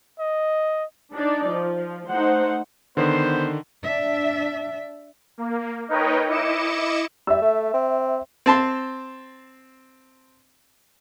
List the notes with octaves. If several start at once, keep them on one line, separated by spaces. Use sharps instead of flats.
D#5
D4 D#4 D5
F3
A3 D#4 C5 F#5
D3 D#3 B3 C5
D4 E5
A#3
D#4 A#4 B4 C#5 D#5 G5
E4 D#5 D6 C#7 E7
G3 E5 E6
A3
C4
C4 A5 C6